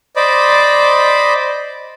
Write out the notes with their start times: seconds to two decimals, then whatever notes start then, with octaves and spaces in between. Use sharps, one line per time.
0.16 C5 D5 D#5 B5 D6